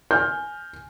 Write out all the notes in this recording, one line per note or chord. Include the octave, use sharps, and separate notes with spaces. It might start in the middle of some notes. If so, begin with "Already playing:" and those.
G#5 F6 G6